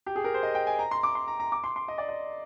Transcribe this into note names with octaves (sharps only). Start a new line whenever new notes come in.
G4
G#4
A#4
C5
D#5
G5
G#5
A#5
C6
D6
C6
A#5
A#5
D6
C6
C6
D#5
D5
D#5